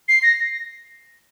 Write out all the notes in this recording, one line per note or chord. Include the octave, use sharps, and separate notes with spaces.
C7
A#6